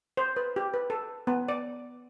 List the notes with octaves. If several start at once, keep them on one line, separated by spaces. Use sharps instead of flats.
C5
B4
G4
B4
A4
B3
D5